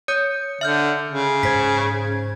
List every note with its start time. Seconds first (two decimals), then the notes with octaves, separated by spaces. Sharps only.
0.08 C#5 D#6 G6 C#7
0.61 D3 E5 F6 G6
1.09 C#3
1.43 G#2 C5 G#6 B6